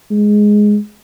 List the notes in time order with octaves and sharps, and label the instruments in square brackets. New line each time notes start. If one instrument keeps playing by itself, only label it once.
[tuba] G#3